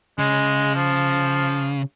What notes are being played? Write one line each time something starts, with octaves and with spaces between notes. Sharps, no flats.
C#3 G#3
F3